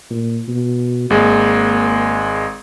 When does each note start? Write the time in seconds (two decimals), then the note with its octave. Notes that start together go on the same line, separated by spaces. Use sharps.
0.10 A#2
0.48 B2
1.10 G#1 G#3 A#3